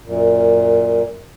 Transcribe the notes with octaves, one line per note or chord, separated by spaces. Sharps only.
F#2 A#2